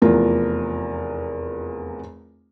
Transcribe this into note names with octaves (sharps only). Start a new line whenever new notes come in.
F1 E2 F4 A#4